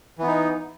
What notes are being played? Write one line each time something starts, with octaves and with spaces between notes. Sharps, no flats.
E3 B3 D#4